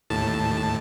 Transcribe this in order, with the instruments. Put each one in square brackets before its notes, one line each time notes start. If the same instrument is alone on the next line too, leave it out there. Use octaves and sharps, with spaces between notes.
[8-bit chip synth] D#2 A2 A5